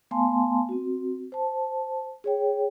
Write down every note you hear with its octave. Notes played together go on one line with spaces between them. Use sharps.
A3 B3 F5 G#5 A5 C6
C4 F#4
C5 A5
G#4 C#5 G5